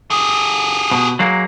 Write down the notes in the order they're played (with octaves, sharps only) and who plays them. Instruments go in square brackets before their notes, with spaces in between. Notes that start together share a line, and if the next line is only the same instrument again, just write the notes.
[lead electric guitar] G4 G#4
[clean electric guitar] B2
F#3 G#3 A#3